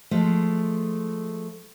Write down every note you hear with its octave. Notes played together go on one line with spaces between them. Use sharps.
F3 G#3 A3